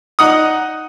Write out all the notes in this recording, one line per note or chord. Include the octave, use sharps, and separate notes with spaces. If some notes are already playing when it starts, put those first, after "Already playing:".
D#4 F#5 D#6